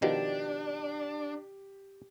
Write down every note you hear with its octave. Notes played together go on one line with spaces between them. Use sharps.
B2 D#3 F3 D4 G4